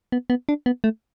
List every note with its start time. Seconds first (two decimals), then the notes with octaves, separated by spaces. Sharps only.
0.12 B3
0.30 B3
0.49 D4
0.66 B3
0.84 A3